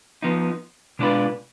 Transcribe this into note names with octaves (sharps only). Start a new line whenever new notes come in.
F3 B3 D#4
B2 G#3 D4 F4 B4